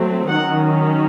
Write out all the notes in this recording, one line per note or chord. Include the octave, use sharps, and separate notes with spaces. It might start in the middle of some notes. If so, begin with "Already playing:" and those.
Already playing: F#3 A3 C4
D#3 F#3 C#4 F#5